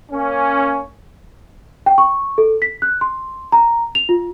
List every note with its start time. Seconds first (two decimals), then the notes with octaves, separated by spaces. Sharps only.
0.11 A#3 C#4
1.86 G5
1.98 C#6
2.38 A4
2.62 B6
2.82 F#6
3.01 C6
3.52 A#5
3.95 F7
4.09 F4